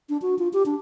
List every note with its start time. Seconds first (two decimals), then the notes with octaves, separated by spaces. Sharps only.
0.09 D4
0.22 F#4
0.39 F4
0.53 G4
0.66 D4